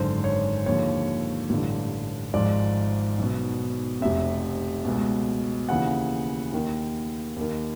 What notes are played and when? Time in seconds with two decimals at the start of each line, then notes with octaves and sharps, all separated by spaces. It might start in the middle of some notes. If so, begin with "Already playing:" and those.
Already playing: G#1 F#2 D3 C5
0.24 C#5
0.66 D#2 D3 F3 C#5
1.50 A1 G2 D3
2.34 G#1 G#2 F3 D5
3.18 B1 B2
4.01 F1 F2 C3 E5
4.85 C#2 B2
5.69 D#2 C#3 E3 F#5
6.52 D#2 D#3
7.36 D#2 D#3